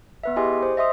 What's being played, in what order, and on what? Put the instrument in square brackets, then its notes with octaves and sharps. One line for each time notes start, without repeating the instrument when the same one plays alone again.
[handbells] B3 B4 E5
E4 G4 G#4 D#5 G#5 C6
C5
D#5 E5 C6 D#6